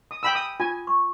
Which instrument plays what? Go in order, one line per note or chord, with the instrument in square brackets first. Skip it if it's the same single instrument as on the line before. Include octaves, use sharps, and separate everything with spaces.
[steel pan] D#6
G5 B5 E6
D#6
[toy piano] F4 [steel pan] G#5
[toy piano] C#6